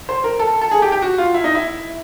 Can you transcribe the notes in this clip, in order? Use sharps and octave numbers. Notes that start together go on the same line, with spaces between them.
C5
A#4
A4
A4
G#4
G4
G4
F#4
F4
E4
D#4
E4